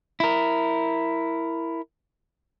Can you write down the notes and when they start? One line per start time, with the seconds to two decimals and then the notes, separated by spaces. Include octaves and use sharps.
0.20 E4 A#4